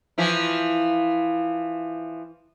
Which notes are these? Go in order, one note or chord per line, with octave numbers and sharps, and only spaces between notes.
E3 F3 E4